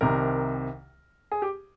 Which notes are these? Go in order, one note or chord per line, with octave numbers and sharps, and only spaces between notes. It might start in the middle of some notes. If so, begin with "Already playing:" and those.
C2 C3 D#3 A#4
G#4
G4